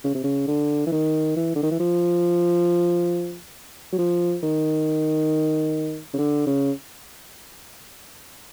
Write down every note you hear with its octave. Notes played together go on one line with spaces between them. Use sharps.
C#3
C3
C#3
D3
E3
D#3
E3
D3
D#3
E3
F3
F#3
F3
D#3
C#3
D3
C#3